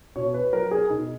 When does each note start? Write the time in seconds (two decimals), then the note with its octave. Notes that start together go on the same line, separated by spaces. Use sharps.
0.16 B2 C#5
0.34 B4
0.53 F#3 A#4
0.71 G#4
0.90 B2 D#4